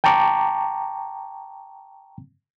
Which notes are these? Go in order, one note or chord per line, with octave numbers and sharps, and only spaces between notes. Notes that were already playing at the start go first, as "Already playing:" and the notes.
G5 A5 A#5 C#6 D6